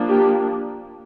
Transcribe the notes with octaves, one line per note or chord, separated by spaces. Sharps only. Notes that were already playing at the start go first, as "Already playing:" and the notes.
Already playing: F3 A#3 D4
G4